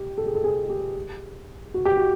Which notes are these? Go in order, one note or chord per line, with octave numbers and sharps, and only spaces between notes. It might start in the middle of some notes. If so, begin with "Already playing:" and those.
Already playing: G4
A4
G#4
A4
G#4
G4
F#4
G4
F#4